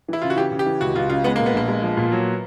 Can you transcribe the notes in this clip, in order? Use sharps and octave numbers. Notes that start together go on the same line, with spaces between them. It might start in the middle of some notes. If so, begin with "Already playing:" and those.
E3 E4
C#3 F4
F#4
E3 G4
C#3
G4
E3
C#2 F#4
C#2 F4
C#3 F4
G#3 B3
A#3
A#2
B3
A#1 A#3
G#3
F3
A#2
F#3